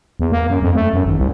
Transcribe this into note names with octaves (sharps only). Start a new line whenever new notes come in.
E2
A#3
F#2
F2
A3
F#2
G#1
C2